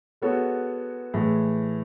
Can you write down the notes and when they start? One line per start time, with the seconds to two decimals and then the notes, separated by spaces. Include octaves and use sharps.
0.22 G#3 B3 F#4 A4 C#5
1.14 A2 E3 G#3